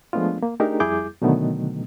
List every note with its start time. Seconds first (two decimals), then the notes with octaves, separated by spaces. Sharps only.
0.13 F3 G#3 A3 B3 D4 F4
0.43 A#3
0.60 A3 D4 D#4 G4 G#4 A#4
0.80 F2 G3 E4 G#4 D6 G6
1.22 B2 D3 D#3 F#3 A3 B3